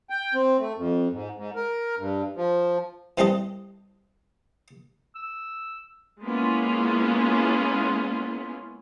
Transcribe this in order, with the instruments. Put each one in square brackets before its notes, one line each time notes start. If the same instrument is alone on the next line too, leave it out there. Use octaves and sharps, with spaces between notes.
[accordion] G5
C4
A3
F2
G#2
G#2
A#4
G2
F3
[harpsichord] E3 G3 C4 A4 D#5
[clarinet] E6
[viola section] G#3 A#3 B3 C#4 E4 F4